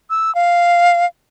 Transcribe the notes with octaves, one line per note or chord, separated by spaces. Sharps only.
E6
F5